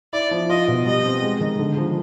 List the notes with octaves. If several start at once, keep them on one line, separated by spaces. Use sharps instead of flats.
E4 D5
F3
F4 D#5
B2
G3 D#5
C4
G#3
D#3
D3
F3